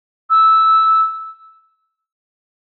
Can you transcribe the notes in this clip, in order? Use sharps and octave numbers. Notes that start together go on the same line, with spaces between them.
E6